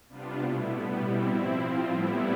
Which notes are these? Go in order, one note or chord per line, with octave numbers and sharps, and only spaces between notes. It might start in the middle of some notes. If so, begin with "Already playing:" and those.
C3 G3 B3 D4 F4
B2 A3 E4
A2 G3 B3
B2 G3 C4 E4
F3 C4 E4
F3 C4 F4
A2 G3 B3 E4